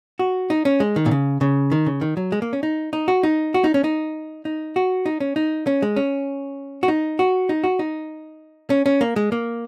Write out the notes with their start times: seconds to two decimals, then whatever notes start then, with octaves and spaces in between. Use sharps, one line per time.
0.19 F#4
0.50 D#4
0.65 C#4
0.80 G#3
0.96 D#3
1.06 A#2
1.11 C#3
1.41 C#3
1.72 D#3
1.86 C#3
2.01 D#3
2.17 F#3
2.32 G#3
2.42 A#3
2.53 C#4
2.63 D#4
2.93 D#4
3.08 F#4
3.23 D#4
3.54 F#4
3.64 D#4
3.74 C#4
3.84 D#4
4.45 D#4
4.76 F#4
5.06 D#4
5.20 C#4
5.36 D#4
5.67 C#4
5.82 G#3
5.96 C#4
6.83 F#4
6.88 D#4
7.19 F#4
7.49 D#4
7.64 F#4
7.79 D#4
8.70 C#4
8.86 C#4
9.01 A#3
9.16 G#3
9.32 A#3